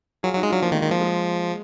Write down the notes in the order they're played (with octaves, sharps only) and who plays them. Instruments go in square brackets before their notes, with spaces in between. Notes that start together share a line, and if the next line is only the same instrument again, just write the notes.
[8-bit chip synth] F#3 [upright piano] F4 G#4
[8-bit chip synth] F#3
[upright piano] D#4 F#4
[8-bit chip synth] G#3
[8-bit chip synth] F#3 [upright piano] D4 F4
[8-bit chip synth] F3 [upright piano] A#3
[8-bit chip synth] D#3
[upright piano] G#3
[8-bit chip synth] D#3
[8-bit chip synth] F3 [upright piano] A#3
[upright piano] G#3